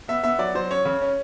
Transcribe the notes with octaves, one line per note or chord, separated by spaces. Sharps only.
B3 E5
B3 E5
F#3 D5
F#3 C5
C#4 C#5
C#3
C#4